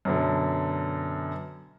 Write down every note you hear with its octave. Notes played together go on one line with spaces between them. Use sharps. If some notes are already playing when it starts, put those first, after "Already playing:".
F#2 B2 D3